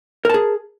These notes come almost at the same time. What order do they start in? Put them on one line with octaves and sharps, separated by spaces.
A#4 A5 G#4